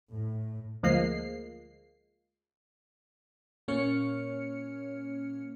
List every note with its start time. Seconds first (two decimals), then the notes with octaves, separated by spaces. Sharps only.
0.11 A2
0.83 D2 F3 G#3 A#3 C7
3.68 A#2 A#3 C#4 C#5 F6 C#7